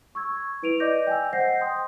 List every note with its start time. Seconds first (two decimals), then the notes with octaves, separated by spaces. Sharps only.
0.15 C#6 E6 G#6
0.63 E4 B4 D7 D#7 F7
0.80 B4 D5 D#5 D6 G6 A#6
1.07 G5 G#5 E6
1.33 C5 D#5 F#5 G6 A#6 C7
1.61 G5 C6 D#6